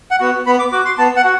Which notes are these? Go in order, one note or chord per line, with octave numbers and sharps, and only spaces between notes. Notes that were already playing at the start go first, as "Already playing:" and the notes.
F#5
B3 F#4
B3 B5
D6
F#4 D6
C6
B3 A5
F#5
F#4